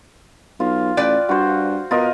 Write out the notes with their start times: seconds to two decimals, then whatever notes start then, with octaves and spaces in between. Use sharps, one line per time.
0.60 B1 F4
0.97 A1 B4 D5 G5
1.29 G2 F#4 C5
1.91 B2 F4 A#4 D#5